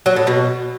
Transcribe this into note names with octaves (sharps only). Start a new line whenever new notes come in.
F#3
A2
B2